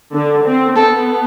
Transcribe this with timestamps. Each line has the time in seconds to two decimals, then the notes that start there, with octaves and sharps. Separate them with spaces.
0.14 D3
0.46 C4
0.76 B3 A4